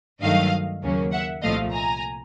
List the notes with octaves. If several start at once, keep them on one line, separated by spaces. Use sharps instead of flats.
G2 D#3 F#3 A3 D#5 F5
D#2 C#3 F#3 A#3 C#4
E5 F#5
C2 A#2 F3 A3 D#5 F5
G#5 A#5